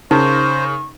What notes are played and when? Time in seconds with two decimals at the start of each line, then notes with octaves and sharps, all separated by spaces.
0.11 C#3 D#4 A#4 C5 C#6